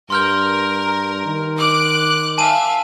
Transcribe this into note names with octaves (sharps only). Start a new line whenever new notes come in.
G2 A#4 C6 F6 G6
D#3
D6 F#6 D7
E5 F5 G#5 A5 D#7